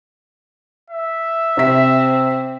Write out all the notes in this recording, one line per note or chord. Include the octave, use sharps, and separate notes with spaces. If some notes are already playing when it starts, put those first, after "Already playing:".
E5
C3 C4 B6